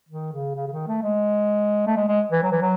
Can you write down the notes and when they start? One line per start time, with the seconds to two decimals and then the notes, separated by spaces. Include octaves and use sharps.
0.09 D#3
0.32 C#3
0.55 C#3
0.68 C#3
0.72 D#3
0.88 A3
1.02 G#3
1.87 A3
1.96 G#3
2.08 G#3
2.32 E3
2.43 F#3
2.52 E3
2.61 F#3